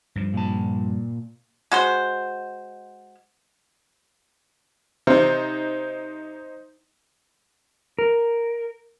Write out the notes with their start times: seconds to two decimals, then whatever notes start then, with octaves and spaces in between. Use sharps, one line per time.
0.16 G2 F3
0.34 A#2 A5
1.72 G#3 F#4 C5
5.07 C3 D#4 C5
7.99 A#4